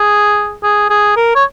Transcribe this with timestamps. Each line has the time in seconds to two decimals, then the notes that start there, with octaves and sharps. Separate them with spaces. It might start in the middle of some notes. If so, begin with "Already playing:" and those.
Already playing: G#4
0.63 G#4
0.90 G#4
1.17 A#4
1.35 C#5